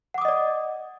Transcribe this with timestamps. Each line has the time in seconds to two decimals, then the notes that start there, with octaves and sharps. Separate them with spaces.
0.14 F#5
0.18 D6
0.21 D#6
0.25 D#5
0.28 D5